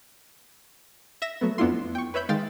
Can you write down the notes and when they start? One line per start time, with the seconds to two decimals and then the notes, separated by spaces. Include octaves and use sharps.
1.22 E5 A#6 E7
1.41 F#3 A3 B3
1.58 F2 B3 D4 E4 F4 C6
1.95 G5 C#6
2.14 B4 C#5 E5 B5 G6
2.29 D#3 G#3 F5 G5 C6 A6